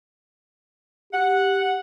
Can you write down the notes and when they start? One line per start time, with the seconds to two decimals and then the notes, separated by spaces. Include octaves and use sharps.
1.13 G4 F#5